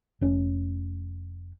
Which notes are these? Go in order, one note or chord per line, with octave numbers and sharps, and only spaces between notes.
F1 C#4